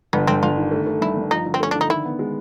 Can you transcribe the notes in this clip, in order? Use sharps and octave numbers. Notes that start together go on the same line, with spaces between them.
G1 B3
G1 C4
G1 F4
D#3
A3
A3
G2 E4
G2
F3 D#4
D3
C4
A3 C#4
D3 D4
D#4
D#3 E4
B3
G#3